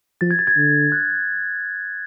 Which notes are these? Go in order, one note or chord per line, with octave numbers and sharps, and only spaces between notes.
F3 A6
G#6
A6
G#6
D3
F#6